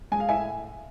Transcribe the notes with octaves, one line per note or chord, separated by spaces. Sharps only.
G#3 G#5
F5
A2 E5 G#5